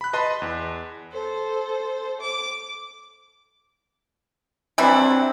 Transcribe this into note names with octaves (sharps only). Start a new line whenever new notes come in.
B5 F#6
B4 D#5 A5 B5 C6
E2
A4 C5
D6
E3 F#3 G3 C4 D4 E4